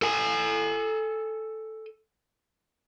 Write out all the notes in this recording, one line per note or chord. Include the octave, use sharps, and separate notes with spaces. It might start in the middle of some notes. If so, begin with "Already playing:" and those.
A4 G#5